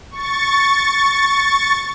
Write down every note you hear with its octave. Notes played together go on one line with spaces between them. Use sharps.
C#6 A6